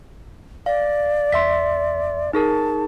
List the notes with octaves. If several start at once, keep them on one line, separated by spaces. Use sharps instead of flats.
D5 F5
E2 E5 C6 B6
D#4 G#4 A#4 A5